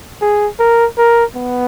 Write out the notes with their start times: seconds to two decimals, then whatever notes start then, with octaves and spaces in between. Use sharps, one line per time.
0.21 G#4
0.59 A#4
0.98 A#4
1.36 B3